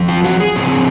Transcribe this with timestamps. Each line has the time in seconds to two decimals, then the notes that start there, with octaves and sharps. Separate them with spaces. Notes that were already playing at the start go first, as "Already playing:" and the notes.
Already playing: F3 C4
0.09 F4
0.24 F#4
0.40 G#4
0.56 C#3 F3 C4